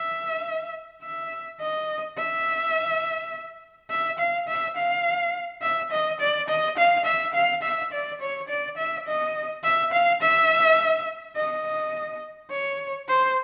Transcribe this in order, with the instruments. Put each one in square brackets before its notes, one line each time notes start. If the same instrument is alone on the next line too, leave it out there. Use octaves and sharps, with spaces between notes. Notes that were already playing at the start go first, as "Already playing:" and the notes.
Already playing: [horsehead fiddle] E5
E5
D#5
E5
E5
F5
E5
F5
E5
D#5
D5
D#5
F5
E5
F5
E5
D5
C#5
D5
E5
D#5
E5
F5
E5
D#5
C#5
C5